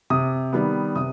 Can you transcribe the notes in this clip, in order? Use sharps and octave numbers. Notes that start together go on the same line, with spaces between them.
C3 D#6
D#3 G3 B3
C3 D#6